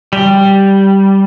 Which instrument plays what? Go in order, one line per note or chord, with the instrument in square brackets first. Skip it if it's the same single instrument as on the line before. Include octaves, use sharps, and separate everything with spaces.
[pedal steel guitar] G3